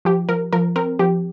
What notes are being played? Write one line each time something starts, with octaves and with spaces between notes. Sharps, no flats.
F3 G4
F3 A#4
F3 A#4
C4 A#4
F3 G4